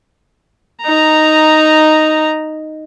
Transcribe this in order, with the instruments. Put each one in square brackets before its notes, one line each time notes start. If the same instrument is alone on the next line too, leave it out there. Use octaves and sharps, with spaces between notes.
[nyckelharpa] D#4 A#5